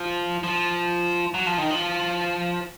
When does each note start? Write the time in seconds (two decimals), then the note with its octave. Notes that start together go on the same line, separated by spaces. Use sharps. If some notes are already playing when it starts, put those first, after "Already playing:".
Already playing: F3
0.44 F3
1.34 F#3
1.46 F3
1.58 D#3
1.70 F3